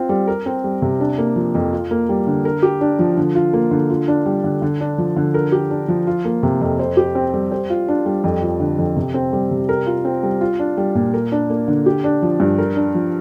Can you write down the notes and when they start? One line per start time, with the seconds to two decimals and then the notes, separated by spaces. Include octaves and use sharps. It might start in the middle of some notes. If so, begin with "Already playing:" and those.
Already playing: C4 F4
0.09 G3
0.28 A#4
0.46 C4
0.64 G3
0.82 C3
1.00 D4
1.18 A#3
1.36 F3
1.55 F2
1.73 F4
1.91 A#3
2.09 G3
2.27 D3
2.45 A#4
2.63 G4
2.81 D4
2.99 F3
3.17 D3
3.35 F4
3.53 A#3
3.71 D3
3.90 F4
4.08 D4
4.26 G3
4.44 D3
4.62 D3
4.80 D4
4.98 F3
5.16 D3
5.34 A#4
5.52 G4
5.70 D4
5.88 F3
6.07 F4
6.25 A#3
6.43 C3
6.61 F2
6.79 C5
6.97 G4
7.15 C4
7.34 G3
7.52 C5
7.70 F4
7.88 D4
8.06 G3
8.24 F2
8.42 F3
8.60 D3
8.79 F2
8.96 C3
9.14 C4
9.33 G3
9.51 C3
9.69 A#4
9.87 F4
10.05 C4
10.23 G3
10.41 F4
10.59 D4
10.77 G3
10.95 A#2
11.14 A#4
11.32 D4
11.50 A#3
11.68 D3
11.86 G4
12.04 D4
12.22 F3
12.40 G2
12.58 A#4
12.76 D4
12.95 F3